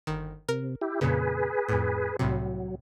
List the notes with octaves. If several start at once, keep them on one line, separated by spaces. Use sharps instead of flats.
G1 D#3
C3 A#4
E4 G4
F2 A#2 C#3 G#4 B4
F2 A2
C2 A2 C3 F#3